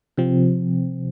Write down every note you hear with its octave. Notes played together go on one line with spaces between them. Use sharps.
C3 F3 C4